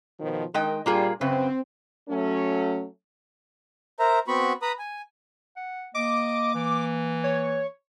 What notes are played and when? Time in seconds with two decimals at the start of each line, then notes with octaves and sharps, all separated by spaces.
0.19 B2 D#3 F3
0.54 D#3 G#3 D#5 G5
0.86 A#2 G3 A#3 F4 G#4
1.21 F#2 C#3 C4 B4
2.09 F#3 A3 C#4
4.00 A#4 C5 E5 A#5
4.28 B3 C4 F#4 B5 C#6
4.62 B4 A#5 B5 D#6
4.79 G#5
5.56 F#5
5.95 A#3 D#5 D6
6.55 E3
7.24 C#5